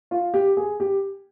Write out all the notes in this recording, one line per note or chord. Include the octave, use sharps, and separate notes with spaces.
F4
G4
G#4
G4